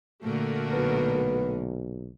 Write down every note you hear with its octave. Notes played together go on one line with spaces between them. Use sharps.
A#2 D3 A3 F#4 A#4
B1 B3